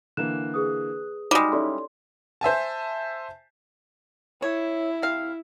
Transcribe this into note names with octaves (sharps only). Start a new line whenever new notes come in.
D3 E3 A#3 F#6 E7
G#4 B4 D#6
G3 G#3 D#4 F#4 G4
C#4 E4 G4 A4 C#5 D5 C6
C5 E5 G#5 A5
E4 C#5
C3 F5